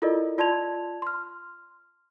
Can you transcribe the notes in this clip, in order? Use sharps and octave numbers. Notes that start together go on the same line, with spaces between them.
E4 F4 A4 A#4 D5 D#5
F4 D5 A5 C6 G#6 F7
C6 F6